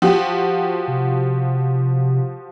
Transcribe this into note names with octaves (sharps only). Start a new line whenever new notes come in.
F3 F#4 G4
C3